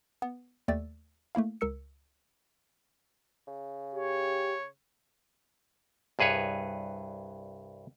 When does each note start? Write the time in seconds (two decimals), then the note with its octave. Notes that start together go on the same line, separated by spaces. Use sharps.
0.22 B3
0.68 D#2 A3 D5 G5 E6 A6
1.35 A3 A#3 E4 F5
1.61 C#2 A#4 E6 C#7
3.48 C#3
3.95 G4 C#5
6.19 C2 G2 G#4 B4 C#5